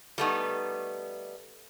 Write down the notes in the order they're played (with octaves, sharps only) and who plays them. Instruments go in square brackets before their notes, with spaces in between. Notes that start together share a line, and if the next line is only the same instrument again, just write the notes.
[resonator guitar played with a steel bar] G3 A3 B3 D#4